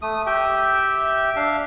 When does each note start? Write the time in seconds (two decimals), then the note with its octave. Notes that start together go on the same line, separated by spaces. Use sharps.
0.02 A3 D#6
0.26 G4 E5 G5
1.36 D4 E5 F5